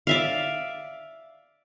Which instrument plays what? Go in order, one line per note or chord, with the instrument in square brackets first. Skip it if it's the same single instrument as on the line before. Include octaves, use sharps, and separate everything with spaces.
[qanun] D5 E5 F5